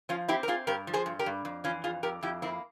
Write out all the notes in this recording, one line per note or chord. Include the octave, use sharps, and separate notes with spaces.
F3 C#4 F4
C4 E4 G4
A#4
C4 F4 G#4
G2 G4 A#4
F3
G#4 C5
G2
G4 A#4
G2
F2
E3 C#4 F4
F2 F4 G#4
F2 G4 A#4
F2 E4 G4
A#3 C4 E4